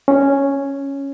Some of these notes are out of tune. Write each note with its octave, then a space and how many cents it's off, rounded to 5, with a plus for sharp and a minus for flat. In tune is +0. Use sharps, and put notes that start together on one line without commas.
C#4 +0